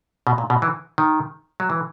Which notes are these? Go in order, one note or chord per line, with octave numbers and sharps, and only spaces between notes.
B2
A#2
B2
E3
D#3
F#3
E3